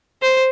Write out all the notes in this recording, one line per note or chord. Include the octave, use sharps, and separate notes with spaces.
C5